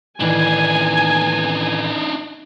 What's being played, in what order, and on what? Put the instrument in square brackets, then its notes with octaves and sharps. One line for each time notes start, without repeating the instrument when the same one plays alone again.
[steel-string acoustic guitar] A2 D#3 E3 [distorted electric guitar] D4 D#4 [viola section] G#5